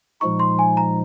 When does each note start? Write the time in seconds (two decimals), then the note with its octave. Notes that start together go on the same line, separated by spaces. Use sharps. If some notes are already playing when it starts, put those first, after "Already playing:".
0.21 A#2 F3 G#3 D#4 C#6
0.40 C6
0.59 G#5
0.77 A#5